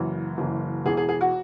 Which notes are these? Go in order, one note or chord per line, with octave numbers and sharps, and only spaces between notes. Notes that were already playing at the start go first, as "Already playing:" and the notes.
Already playing: F#1 F#2 E3
F#1 F#2 E3
E1 E2 E3 G#4
G#4
G#4
F#4